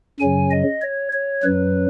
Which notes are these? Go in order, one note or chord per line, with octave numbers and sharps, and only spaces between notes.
F#2 C#3 F#3 G#5
D#5
C#5
C#5
F#2 F#3 B4